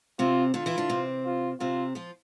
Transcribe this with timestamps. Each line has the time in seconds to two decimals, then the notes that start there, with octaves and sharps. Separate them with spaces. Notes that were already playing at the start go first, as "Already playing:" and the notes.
0.19 C3 C4 F4
0.54 D3 D4 F4
0.66 E3 E4
0.78 D3 D4
0.89 C3 C4
1.25 F4
1.60 C3 C4 F4
1.95 F3 F4